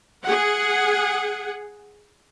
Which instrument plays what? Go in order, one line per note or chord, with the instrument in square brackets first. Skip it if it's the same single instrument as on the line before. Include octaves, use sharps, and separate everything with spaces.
[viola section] G#4 F#5